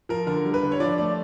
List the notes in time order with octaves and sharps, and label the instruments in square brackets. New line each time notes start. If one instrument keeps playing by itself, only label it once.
[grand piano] F3 A#4
D3 A#4
G3
B4
D3
C#5
F3 D5
A3 D5